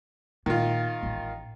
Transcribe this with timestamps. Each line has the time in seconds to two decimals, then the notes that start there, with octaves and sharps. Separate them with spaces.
0.46 A#2 D#3 F4
1.03 A1